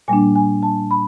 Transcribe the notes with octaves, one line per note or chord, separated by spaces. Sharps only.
A#2 G3 A#3 D4 G#5
G#5
A5
B5